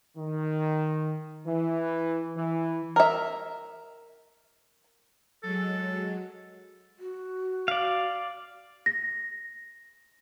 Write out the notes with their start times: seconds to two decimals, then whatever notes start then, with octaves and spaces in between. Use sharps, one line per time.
0.16 D#3
1.45 E3
2.35 E3
2.96 A#4 E5
5.43 F#3 G#3 A4
6.99 F#4
7.68 D5 F5
8.86 A#6